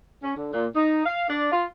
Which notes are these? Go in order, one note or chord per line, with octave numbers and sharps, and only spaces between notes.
C#4
D3
A#2
D#4
F5
D4
F4